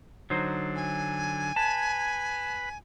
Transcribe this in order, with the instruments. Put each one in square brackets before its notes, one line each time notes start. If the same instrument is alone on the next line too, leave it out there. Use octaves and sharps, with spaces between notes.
[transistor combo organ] D3 [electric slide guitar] F#3 D#4 C5
[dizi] G#5
[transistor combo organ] B4 B5 [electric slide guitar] A5